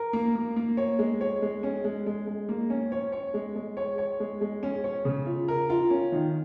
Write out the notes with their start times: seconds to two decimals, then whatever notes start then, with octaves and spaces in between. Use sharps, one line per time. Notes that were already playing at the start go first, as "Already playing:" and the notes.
Already playing: A#4
0.13 A#3
0.35 A#3
0.56 A#3
0.77 C#5
0.99 G#3
1.21 C#5
1.42 G#3
1.63 C#4
1.84 G#3
2.07 G#3
2.27 G#3
2.49 A#3
2.70 C#4
2.92 C#5
3.12 C#5
3.34 G#3
3.55 G#3
3.77 C#5
3.98 C#5
4.20 G#3
4.41 G#3
4.63 C#4
4.84 C#5
5.05 C#3
5.26 F4
5.48 A#4
5.70 F4
5.90 C#4
6.12 D#3